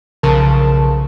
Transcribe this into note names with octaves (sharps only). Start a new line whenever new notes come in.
B1 C#3 F3 A#4 A5